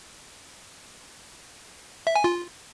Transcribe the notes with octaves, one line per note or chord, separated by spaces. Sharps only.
E5
G#5
F4